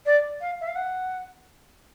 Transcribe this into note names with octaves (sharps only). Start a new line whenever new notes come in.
D5
F5
E5
F5
F#5